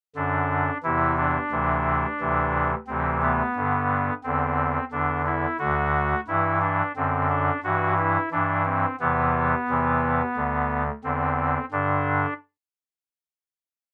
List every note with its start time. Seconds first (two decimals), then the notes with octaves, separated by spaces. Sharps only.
0.15 F#2 D3 D4
0.83 E2 C3 E3 E4
1.17 D4
1.51 D2 C3 E3
2.20 D2 C3 E3
2.87 D2 C3 E3 C4
3.22 B3
3.56 G2 D3
4.23 E2 D3 C4
4.91 E2 D3 D4
5.26 E4
5.59 D2 D3 F#4
6.28 G2 E3 E4
6.61 D4
6.96 F#2 D3 C4
7.29 D4
7.63 G2 E3 F#4
7.98 E4
8.31 G2 E3 D4
8.65 C4
9.00 E2 C3 E3 B3
9.68 E2 C3 E3
10.36 D2 D3
11.04 E2 D3 C4
11.71 G2 D3 D4